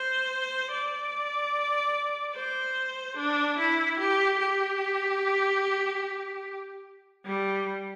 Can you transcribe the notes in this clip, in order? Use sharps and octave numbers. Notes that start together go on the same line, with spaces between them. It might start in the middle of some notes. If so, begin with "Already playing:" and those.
Already playing: C5
D5
C5
D4
E4
G4
G4
G3